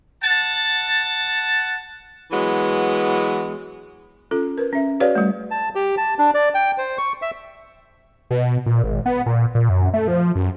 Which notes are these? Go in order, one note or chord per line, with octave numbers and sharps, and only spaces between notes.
F#5 A5
E3 F#3 G#3 B3
C#4 F4 A4
A#4 B4
C#4 E5
F#4 G#4 B4 C#5 D5 F5
G3 A3
A5
G4
A5
D4
D5
G5
C5
C#6
E5
B2
A#2
G#1
B3
A#2
A#2
F#2
A3
F3
F#2